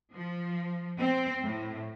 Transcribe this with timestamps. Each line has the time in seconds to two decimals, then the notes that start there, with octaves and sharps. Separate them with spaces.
0.14 F3
0.99 C4
1.43 A2